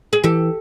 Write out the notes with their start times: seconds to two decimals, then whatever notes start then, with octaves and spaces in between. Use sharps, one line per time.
0.13 G#4
0.24 E3 G4 A4